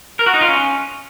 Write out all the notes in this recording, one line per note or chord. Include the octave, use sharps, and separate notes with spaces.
A#4
F#4
D#4
F4
C#4